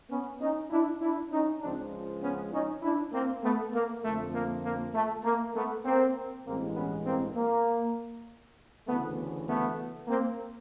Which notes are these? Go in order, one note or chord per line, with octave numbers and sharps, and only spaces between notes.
B3 C#4
C#4 D#4
D4 E4
D4 E4
C#4 D#4
C#2 C#3 F3 G#3 C4 D4
B3 C#4
C#4 D#4
D4 E4
A#3 C4
A3 B3
A#3
F2 D3 F3 A3
A#3
A#3
A3
A#3
A3 B3
A#3 C4
A1 G2 E3 G#3 A#3 C4
B3 C#4
A#3 C4
A#3
D2 C#3 E3 A3 B3
A3 B3
A#3 C4